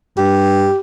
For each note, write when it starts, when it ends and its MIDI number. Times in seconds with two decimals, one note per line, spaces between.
0.18 0.69 43
0.18 0.80 67